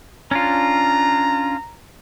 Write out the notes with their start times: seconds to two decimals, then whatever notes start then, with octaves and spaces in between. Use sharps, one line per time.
0.31 C#4 D4 F4 A#5